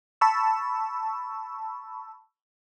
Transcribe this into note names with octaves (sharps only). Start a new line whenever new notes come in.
A5 B5 C#6 E6